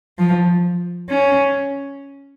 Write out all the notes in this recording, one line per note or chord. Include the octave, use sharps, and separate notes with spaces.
F3
C#4